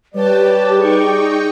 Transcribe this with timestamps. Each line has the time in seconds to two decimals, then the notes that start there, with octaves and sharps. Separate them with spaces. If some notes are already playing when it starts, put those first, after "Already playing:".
0.15 G3 G4 B4 C#5 D5 A5
0.77 D#4 G#4 G5 C#6